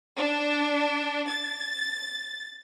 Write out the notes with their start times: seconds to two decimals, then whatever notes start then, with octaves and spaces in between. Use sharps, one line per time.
0.17 D4
1.28 A6